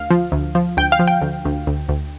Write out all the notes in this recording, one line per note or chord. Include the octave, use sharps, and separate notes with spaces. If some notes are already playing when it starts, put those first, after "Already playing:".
Already playing: D2 F5
F3
D2
F3
D2 G5
F5
F3
G5
D2
D2
D2
D2